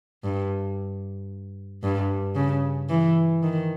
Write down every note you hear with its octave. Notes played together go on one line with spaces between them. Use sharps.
G2
G2
C#3
E3
D#3